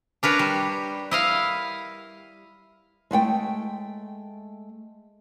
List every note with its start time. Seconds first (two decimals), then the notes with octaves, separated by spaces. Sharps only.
0.23 D4 A#4 B4 C#5
0.39 G3
1.11 E4 D#5 F5
3.11 G#3 A3 F#5 G5